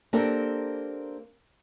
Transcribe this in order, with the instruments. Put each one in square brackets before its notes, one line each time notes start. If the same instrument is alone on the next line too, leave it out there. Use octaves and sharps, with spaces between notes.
[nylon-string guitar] A#3 C4 D4 G4 A4 A#4